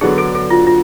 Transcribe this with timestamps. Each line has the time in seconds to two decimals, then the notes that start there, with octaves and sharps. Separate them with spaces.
0.01 D3 F#3 B3 D4 G#4
0.18 A4
0.35 A4
0.51 F4
0.67 F4